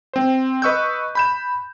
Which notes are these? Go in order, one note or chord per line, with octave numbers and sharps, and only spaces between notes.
C4 C5
B4 D#5 C#6 E6 F#6 G6
B5 G6 E7